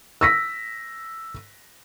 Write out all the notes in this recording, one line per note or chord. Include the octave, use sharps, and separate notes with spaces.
E6 A#6 B6